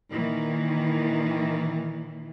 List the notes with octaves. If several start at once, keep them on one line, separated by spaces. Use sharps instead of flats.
A#2 D#3 E3